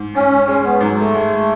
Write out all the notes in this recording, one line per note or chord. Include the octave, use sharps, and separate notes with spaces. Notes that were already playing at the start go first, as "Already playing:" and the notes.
Already playing: G#2
G#2 C#4
G#3 C#4
B3
G#2 F#3
A3
G#3